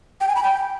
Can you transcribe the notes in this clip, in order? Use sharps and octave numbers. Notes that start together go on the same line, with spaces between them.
G5
G#5
B5
G5